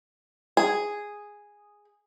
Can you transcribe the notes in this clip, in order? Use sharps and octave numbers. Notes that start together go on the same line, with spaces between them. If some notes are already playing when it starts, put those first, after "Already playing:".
G#4